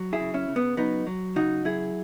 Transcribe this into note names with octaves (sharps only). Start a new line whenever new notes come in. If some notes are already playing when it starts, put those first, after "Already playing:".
Already playing: F#3
E4 G#4
C#3
C#4 E4
C#3
B3
F#3 B3 D#4
F#3
C#3 D#4 F#4
F#3 E4 G#4